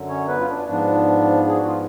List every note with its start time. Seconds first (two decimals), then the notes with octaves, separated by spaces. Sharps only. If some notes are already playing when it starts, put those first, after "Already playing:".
Already playing: F#2 D3 F#3
0.09 C#4 C#5
0.28 B3 B4
0.40 F4
0.49 D4
0.68 G#2 F3 B3 D4
1.48 G#4
1.57 F#4
1.67 F4